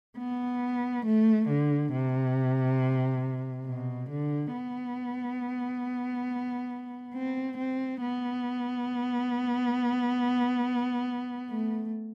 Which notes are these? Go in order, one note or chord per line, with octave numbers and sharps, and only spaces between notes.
B3
A3
D3
C3
B2
D3
B3
C4
C4
B3
A3